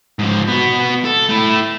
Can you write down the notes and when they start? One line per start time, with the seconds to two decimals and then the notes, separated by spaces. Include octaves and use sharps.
0.19 G#2 F3
0.48 B3 F#4
1.05 A4
1.29 A3 E4